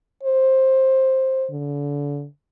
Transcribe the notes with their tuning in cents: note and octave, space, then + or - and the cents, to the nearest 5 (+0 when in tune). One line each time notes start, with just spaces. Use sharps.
C5 +10
D3 -35